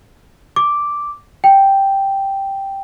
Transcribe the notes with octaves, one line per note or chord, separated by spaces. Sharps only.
D6
G5